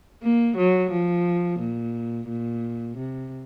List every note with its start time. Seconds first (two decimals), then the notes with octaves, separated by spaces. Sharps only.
0.23 A#3
0.57 F#3
0.92 F3
1.60 A#2
2.29 A#2
2.97 C3